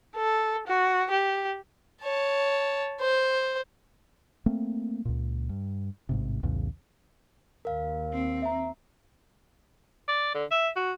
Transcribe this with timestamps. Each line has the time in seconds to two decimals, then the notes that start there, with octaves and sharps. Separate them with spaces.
0.16 A4
0.67 F#4
1.11 G4
2.02 C#5 A5
3.00 C5
4.46 A3 A#3 C4
5.05 C#2 A#2
5.49 G2
6.09 A1 G#2 C3
6.43 B1 E2 A2 C#3
7.65 D#2 A#4 F5
8.13 C4
8.42 E5 A#5
10.08 D5
10.34 D3
10.51 E5
10.76 F#4